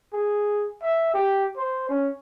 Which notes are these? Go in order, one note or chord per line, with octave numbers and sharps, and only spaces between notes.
G#4
E5
G4
C5
C#4